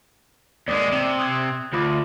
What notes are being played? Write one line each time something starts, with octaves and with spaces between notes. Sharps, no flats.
D#2 G#3 D5 D6
C3
D#6 F#6 G#6
D2 F4 B5 D6